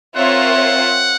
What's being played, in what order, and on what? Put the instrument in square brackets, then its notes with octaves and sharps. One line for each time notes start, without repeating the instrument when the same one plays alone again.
[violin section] C4 F4 A#4 C#5 E5 [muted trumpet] F#5